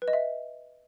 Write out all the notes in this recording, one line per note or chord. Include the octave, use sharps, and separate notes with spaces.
B4
D#5
E5